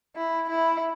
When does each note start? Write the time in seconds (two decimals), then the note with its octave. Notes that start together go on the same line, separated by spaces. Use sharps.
0.16 E4
0.50 E4